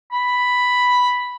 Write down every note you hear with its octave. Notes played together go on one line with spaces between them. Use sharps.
B5